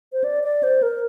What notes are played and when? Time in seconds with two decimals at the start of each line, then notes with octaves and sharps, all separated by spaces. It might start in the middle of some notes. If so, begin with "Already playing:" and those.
0.13 C5
0.24 D5
0.44 D5
0.63 C5
0.82 A#4